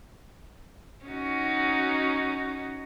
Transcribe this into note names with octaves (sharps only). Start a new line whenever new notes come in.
C#4 D#4 F#4